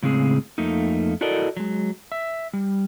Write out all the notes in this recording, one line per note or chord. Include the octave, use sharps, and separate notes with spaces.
A2 C#3 G#3 C4 G#4
F2 A3 A#3 D#4
E4 F#4 A4 A#4 D5 D#5
F#3 G#3
E5
G3